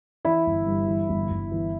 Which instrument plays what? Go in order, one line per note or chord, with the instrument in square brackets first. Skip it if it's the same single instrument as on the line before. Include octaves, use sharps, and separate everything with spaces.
[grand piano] E3 [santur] E4
[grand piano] G1
G2
E3
G1
G1
E3